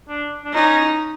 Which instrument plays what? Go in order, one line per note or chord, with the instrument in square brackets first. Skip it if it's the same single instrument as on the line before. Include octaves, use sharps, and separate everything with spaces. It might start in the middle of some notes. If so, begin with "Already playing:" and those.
[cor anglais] D4
D4
[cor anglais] C#4 [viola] D#4